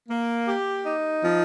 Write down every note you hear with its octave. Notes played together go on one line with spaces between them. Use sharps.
A#3
G4
D#4
F3